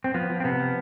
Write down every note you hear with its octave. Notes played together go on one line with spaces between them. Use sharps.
C4
F3 B3
F3
C4
C3 B3
F3